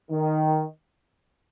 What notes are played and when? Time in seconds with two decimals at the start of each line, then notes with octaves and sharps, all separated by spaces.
0.11 D#3